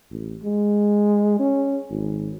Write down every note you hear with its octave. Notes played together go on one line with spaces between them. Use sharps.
A1
G#3
C#4
G#1